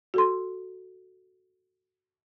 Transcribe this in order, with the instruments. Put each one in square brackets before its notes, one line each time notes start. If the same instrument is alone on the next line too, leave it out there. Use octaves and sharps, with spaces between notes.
[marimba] F#4 A4 C6